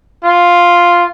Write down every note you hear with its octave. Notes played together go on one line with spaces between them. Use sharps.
F4